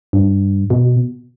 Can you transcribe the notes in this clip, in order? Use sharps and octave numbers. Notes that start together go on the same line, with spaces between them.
G2
B2